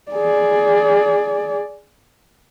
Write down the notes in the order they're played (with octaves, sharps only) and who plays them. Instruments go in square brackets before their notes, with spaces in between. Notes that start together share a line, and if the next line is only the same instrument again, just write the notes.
[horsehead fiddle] G#4 D5